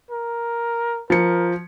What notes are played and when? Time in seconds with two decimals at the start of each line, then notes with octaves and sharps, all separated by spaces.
0.11 A#4
1.10 F3 A#4 C#7